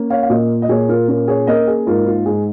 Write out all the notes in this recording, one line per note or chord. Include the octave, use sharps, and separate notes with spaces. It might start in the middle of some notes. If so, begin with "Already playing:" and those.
Already playing: A#3 C#4
C#5 F5
F5
A#2 A#4 D#5
D#5
A#2 G#4 C#5
F4 A#4
C#4 F4 A#4
G#4 C#5
A#3 A#4 D#5
G#4
G#2 F4 A#4
F4
G#2 G#4